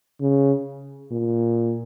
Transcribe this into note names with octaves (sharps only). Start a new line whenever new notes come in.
C#3
A#2